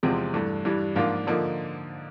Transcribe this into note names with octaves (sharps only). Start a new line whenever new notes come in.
E2 C3 F3 G#3 C4
G2 E3 A3
G2 E3 G3
G#2 F3 A#3 D4 F4
D3 F3 A#3 D#4